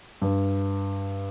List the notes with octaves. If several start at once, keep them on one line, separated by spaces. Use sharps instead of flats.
G2